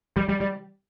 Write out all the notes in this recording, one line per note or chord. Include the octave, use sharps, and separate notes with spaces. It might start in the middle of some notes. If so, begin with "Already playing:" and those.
G3
G3
G3